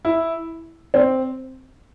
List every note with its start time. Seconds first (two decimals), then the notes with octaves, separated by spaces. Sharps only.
0.05 E4
0.94 C4